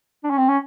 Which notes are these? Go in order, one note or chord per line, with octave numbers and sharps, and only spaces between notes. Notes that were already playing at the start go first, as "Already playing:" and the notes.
D4
C#4
C4
C#4